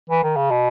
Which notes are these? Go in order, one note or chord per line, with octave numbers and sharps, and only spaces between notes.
E3
D#3
C#3
B2